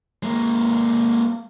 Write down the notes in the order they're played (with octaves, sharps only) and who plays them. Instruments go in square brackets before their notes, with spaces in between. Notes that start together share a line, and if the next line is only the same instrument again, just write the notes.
[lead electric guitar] G#3 A#3